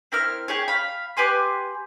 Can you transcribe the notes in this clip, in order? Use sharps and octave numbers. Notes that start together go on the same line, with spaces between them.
C4 E4 A#4 F6
G4 G#4 C#5
F5 B5
G4 B4 G#5 C6